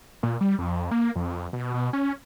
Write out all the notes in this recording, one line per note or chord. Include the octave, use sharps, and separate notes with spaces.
A#2
G3
F2
A#3
F2
B2
B2
C#4